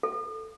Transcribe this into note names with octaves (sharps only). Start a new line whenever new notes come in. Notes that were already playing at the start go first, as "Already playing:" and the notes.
A4